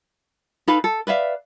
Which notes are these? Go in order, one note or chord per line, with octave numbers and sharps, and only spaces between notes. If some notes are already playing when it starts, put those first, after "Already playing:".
D#4 A4 B4 F5
A4
B4 D5 E5 F5